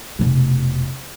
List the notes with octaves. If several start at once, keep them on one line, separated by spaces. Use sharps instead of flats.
F1 B2